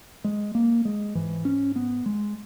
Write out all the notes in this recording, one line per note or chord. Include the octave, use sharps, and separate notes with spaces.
G#3
A#3
G#3
G#2 E3
C#4
B3
G#3